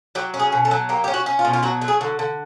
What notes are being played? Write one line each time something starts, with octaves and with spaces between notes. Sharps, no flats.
F#3 G4
C#4
G#4
B2
A4
F#3
A#3 G4
C#4 G4
F#4
C#4
F4
B2
F4
F#3 F#4
F#3
G#4
D3
D3